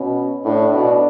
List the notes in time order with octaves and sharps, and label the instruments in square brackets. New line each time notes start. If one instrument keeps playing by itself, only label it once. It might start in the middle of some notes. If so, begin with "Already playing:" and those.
Already playing: [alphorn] B2 [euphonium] C#4
[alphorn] A2 [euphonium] D4
[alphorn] B2 [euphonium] D4